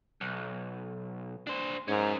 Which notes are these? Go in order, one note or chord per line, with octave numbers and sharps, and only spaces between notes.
B1
D4 C5
G#2 C#4 A#4